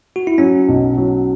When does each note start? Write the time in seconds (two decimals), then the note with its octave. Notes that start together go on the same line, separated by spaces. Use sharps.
0.16 F#4
0.27 E4
0.38 F#3 C#4
0.68 B1
0.98 F#3